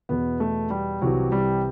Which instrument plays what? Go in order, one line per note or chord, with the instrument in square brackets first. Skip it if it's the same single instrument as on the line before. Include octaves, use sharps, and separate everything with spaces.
[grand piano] E2 B2 B3
A3
G3
C2 C3 E3 F#3
G3